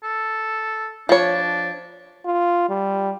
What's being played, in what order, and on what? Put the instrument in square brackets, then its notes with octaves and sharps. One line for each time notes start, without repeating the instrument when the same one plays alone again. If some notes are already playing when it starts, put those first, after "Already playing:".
[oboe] A4
[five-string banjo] F3 C#5 [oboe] D4
[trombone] F4
G3